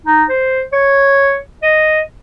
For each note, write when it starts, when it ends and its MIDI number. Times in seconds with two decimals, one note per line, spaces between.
0.06 0.24 63
0.29 0.61 72
0.72 1.37 73
1.63 1.99 75